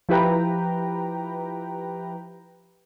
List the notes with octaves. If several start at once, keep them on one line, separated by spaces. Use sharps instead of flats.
F3 E4 G4 B4 G5 A#5